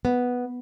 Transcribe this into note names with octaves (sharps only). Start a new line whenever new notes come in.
B3